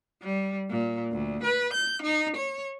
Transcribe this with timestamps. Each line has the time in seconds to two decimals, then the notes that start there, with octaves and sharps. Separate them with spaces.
0.22 G3
0.69 A#2
1.11 D2
1.43 B4
1.73 G6
2.02 D#4
2.36 C#5